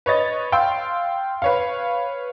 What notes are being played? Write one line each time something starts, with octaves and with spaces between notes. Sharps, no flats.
B4 C#5 D#5 A6
F5 G5 C6 E6
B4 C#5 F5